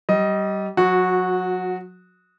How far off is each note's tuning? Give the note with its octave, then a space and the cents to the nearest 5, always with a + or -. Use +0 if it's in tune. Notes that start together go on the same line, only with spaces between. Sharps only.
G3 -25 D#5 +10
F#3 -35 F#4 -10